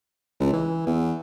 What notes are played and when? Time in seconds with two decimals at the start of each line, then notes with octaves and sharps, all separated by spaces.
0.40 C#2
0.53 E3
0.86 E2